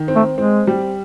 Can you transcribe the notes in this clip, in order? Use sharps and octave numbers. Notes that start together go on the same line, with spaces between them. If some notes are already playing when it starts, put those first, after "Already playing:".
Already playing: D#3
C4
A3
G#3 C4
G3